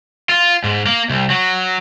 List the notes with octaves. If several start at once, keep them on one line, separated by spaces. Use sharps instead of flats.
F4
G#2
A#3
C2
F#3